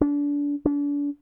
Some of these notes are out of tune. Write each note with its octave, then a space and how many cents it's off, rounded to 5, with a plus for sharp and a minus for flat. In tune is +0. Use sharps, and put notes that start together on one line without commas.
D4 -30
D4 -35